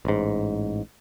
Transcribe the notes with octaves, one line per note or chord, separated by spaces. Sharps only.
A1 G#2